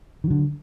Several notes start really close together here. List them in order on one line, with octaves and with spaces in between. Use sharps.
D#3 F#3 D3